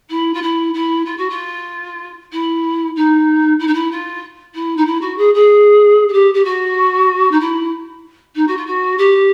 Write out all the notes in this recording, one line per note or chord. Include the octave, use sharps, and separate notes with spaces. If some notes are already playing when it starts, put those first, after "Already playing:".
E4
F4
E4
E4
F4
F#4
F4
E4
D#4
E4
D#4
E4
F4
E4
D#4
E4
F#4
G#4
G#4
G#4
G4
G4
F#4
D#4
E4
D#4
F#4
F4
F#4
G4